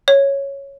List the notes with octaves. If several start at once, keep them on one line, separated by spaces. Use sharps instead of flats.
C#5